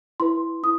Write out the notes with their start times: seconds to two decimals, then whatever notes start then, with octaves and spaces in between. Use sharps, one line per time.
0.20 E4 B4 C6
0.63 E4 D#6